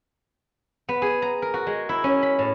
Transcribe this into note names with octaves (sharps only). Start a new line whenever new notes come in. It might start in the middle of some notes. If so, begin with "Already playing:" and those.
B3
G#4
A#5
A#4
F#4
G#3
E4
C#4
B5
A2